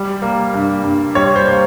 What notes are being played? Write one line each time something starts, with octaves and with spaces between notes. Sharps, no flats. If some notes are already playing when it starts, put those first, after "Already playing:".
Already playing: G3
A#3
G2
G2
G3 C#5
C5
A#3